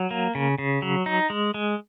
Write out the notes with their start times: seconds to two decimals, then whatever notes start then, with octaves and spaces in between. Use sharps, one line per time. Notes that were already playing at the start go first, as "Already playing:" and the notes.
Already playing: F#3
0.11 A#3
0.35 C#3
0.58 C#3
0.82 F#3
1.06 D#4
1.30 G#3
1.54 G#3